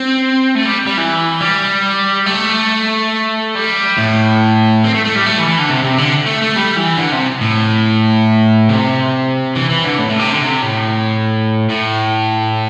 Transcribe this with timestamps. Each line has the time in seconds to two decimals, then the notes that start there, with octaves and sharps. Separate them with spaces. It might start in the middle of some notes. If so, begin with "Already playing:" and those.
Already playing: C4
0.55 A3
0.66 G3
0.87 G3
0.98 E3
1.40 G3
2.26 A3
3.55 G3
3.98 A2
4.84 C4
4.94 A3
5.05 A3
5.16 G3
5.26 A3
5.38 E3
5.48 E3
5.58 D3
5.69 C3
5.84 C3
5.98 D3
6.26 A3
6.41 A3
6.56 G3
6.77 E3
6.97 D3
7.12 C3
7.41 A2
8.69 C3
9.55 E3
9.70 E3
9.84 D3
9.98 A2
10.09 A2
10.19 C3
10.30 D3
10.41 C3
10.62 A2
11.70 A2